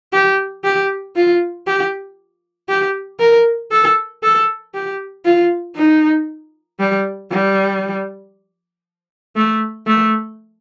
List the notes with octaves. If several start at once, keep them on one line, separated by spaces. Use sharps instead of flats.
G4
G4
F4
G4
G4
A#4
A4
A4
G4
F4
D#4
G3
G3
A3
A3